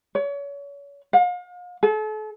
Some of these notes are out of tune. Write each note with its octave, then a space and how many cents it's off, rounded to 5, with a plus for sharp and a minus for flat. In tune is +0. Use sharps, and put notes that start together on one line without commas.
C#5 +35
F5 +40
A4 -40